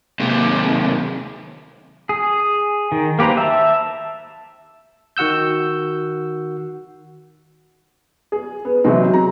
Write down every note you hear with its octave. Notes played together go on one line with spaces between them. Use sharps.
D#2 C3
G#4
D#3
A#3 G4 B4 C5 A#5
E5 A5
D#3 F#4 F#5 E6 G6
G#4
B3
C3 E3 F#3 G#3 D#4 F#4
A#5